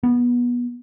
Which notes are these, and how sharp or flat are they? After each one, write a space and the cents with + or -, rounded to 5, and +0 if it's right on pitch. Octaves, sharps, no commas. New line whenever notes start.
B3 -25